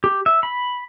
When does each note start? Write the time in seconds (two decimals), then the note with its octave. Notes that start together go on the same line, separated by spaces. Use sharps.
0.04 G4
0.26 E5
0.43 B5